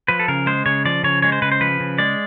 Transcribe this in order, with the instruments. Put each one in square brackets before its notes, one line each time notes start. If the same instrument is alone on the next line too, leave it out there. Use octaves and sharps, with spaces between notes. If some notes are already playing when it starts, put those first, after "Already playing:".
[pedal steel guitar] F3 B4
A4
C#3 A#4
G#3 C5
C#3 C#5
F3 D5
C#3 C#5
G#3 C#5
C5
C#3 B4
C5
F3 B4
C#3
G#3 D5